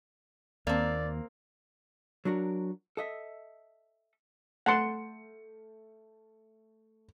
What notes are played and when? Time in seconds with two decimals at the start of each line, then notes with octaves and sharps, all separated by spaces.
0.67 D#2 A#3 C4 D5
2.25 F#3 D4 F#4 A#4
2.97 A4 D#5 E5
4.66 A3 F#5 A5 C6 C#7